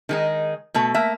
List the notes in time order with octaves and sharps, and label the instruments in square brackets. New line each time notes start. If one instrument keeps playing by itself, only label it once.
[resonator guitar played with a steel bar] D#3 G#3 D#4
B2 A3 A4
A3 A#3 E5